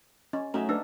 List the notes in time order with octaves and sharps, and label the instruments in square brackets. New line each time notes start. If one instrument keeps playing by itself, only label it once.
[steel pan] C#4 [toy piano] D#5
[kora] F#3 D#4 E5 [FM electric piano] A3 [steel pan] C#4
[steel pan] D4 [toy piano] B4 E6